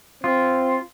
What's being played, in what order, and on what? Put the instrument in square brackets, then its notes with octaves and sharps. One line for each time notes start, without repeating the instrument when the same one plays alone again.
[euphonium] C4 [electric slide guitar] F4